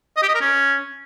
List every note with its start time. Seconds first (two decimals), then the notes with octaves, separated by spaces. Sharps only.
0.17 D#5
0.23 G4
0.29 D#5
0.35 A#4
0.41 C#4